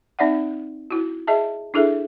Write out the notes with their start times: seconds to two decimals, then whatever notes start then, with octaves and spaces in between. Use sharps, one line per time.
0.19 C4 D#4 D5 E5 F#5
0.91 E4 F#4
1.27 G#4 D#5 E5 A5
1.74 D4 E4 G#4 A4 E5